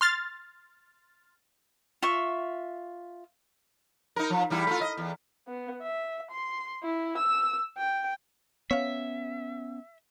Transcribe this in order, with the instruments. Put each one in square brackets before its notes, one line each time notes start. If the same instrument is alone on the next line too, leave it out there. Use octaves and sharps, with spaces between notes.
[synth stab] C6 F6 A6
[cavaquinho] F4 E5 C#6
[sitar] D#4 A#4
F3
E2 G3 E4
A3 F4
D#5
E2
[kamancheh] B3
E5
C6
E4
E6
G5
[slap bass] B3 C#4 [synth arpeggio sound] C#5 F5 [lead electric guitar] E5